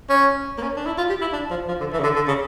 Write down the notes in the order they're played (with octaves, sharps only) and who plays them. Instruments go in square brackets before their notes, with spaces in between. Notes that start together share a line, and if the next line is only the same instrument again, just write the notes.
[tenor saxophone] C#4
A#3
C#4
D4
E4
F4
G4
E4
D4
F3
F3
D3
E3
C#3
D3
D3
C#3